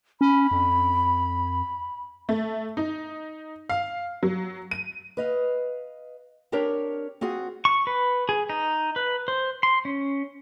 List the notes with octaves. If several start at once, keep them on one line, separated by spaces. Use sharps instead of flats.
C#4 B5
F2
A3
D#4
F5
F#3
D#7
B4 D#5 F5
C4 D4 G4 A#4 C#5
C4 F4 F#4 G#4
C#6
B4
G#4
D#4
B4
C5
C6
C#4